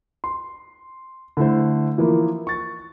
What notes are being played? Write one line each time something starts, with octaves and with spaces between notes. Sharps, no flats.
C6
D3 A3 E4 C5
E3 F3 A#3 E4
C#6 A6